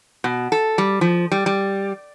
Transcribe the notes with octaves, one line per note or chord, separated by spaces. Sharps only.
B2
A4
G3
F3
G3
G3